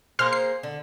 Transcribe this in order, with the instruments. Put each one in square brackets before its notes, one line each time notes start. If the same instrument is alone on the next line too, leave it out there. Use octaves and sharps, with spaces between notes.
[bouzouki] A#3 G#4 C5 [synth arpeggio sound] C6 F6
[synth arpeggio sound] C7
[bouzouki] D3